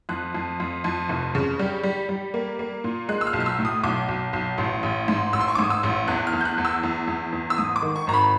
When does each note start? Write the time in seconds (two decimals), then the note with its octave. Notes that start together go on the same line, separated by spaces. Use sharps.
0.09 F2 F#6
0.35 F2
0.60 F2
0.84 F2
1.09 F1
1.35 C#3
1.59 G3
1.83 G3
2.09 G3
2.34 A#3
2.59 A#3
2.84 A#2
3.09 G#3 F#6
3.21 E6
3.27 F6
3.33 B1
3.40 F6
3.46 E6
3.59 A2
3.65 D#6
3.83 B1 D6
4.08 B1
4.33 B1
4.58 A1
4.83 A1
5.08 G#2
5.33 A1 E6
5.41 C6
5.48 C#6
5.55 D6
5.59 G#2
5.64 D#6
5.70 E6
5.83 A1
6.08 E2 F#6
6.27 F6
6.33 E2
6.41 G6
6.45 F#6
6.58 E2
6.65 E6
6.83 E2
7.08 E2
7.33 E2
7.50 E6
7.58 G#2 D#6
7.76 D6
7.82 D#3
7.96 C#6
8.07 G#1 A#5
8.14 B5